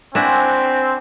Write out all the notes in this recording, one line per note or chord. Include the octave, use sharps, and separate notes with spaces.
C4 D4 E4 F#4 G#5